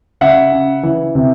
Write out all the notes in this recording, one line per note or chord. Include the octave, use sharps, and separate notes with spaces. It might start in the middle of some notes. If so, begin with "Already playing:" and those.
C#3 E5 F#5
C#3
E3
C3